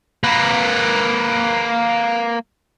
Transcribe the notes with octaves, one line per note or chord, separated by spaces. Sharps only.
A#3 B4